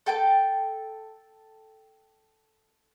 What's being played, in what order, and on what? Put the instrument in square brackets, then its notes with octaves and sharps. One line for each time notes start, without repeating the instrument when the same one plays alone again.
[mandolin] A4 G5 A5